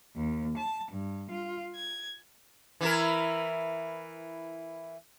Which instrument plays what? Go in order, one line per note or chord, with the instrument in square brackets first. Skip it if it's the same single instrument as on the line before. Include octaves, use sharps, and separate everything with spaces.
[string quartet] D#2
A5
G2
F4
G#6
[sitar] E3 E4 A#4